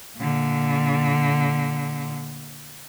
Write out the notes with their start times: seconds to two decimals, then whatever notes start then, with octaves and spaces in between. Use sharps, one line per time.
0.17 A#2 D3